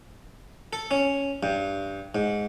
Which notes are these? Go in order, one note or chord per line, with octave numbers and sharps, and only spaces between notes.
A4
C#4
G2
G#2